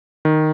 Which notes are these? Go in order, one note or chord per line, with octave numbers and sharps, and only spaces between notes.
D#3